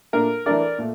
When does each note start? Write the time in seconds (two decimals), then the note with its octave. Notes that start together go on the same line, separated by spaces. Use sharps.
0.13 A#2 A3 D4 A#4
0.46 E3 A3 D4 A#4 D5
0.78 A#2 A3